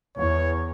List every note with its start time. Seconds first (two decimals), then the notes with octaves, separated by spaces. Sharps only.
0.17 E2 C#5